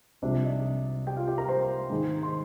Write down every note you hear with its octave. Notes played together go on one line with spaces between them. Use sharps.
C2 C3 F3 G#3 D4 D5
D#4 D#5
G4 G5
F4 F5
G4 G5
A#4 A#5
C5 C6
G#2 D#3 G#3
C6